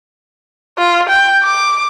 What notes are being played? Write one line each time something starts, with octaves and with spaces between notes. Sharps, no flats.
F4
G5
D6